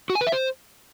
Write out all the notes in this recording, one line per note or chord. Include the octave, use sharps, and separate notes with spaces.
F#4
G#5
B4
E5
C5